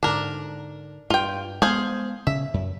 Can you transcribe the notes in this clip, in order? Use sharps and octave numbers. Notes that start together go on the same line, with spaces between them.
G#2 D3 D4 A#4
G2 F4 G5
G#3 B3 G#4 C5 F5
C#3 E5
F#2